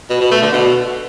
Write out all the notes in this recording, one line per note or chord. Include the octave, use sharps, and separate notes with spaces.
B2
B2
A3
D3
B2